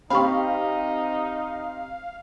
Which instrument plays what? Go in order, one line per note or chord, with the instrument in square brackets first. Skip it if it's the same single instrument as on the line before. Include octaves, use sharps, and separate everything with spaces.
[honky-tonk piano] C4 G4 [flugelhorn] D#4 [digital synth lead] F5 [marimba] B5 C#6